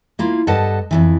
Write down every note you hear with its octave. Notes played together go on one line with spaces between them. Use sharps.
A#3 E4 F4
G2 A4 B4 D#5 F#5 A5
F2 G#2 E3